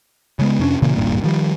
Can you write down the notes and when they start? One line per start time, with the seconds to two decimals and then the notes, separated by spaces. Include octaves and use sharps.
0.39 C#3 G#3 B3
0.59 F2 C3 C#4 D4
0.82 A#2 C#3 E3 A#3
0.96 D#1 G#1 G2 A#2
1.24 D#3 F3 G3